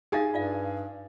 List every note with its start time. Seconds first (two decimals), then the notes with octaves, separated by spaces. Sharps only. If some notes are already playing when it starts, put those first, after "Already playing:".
0.12 D#4 G#4 F5 G#5 A6
0.34 G2 F4 D5 F5